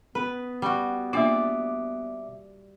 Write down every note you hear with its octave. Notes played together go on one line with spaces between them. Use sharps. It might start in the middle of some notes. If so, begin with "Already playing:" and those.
B3 B4
G3 F#4
A#3 D4 F4 D5 E5 D6